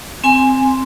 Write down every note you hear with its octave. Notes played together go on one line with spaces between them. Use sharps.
C4 G#5 C6